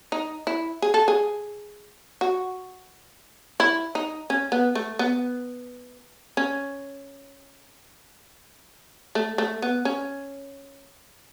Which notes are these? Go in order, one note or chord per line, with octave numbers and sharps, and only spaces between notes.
D#4
E4
G#4
A4
G#4
F#4
E4
D#4
C#4
B3
A3
B3
C#4
A3
A3
B3
C#4